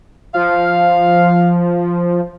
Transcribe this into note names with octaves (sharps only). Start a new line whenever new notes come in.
F3 F5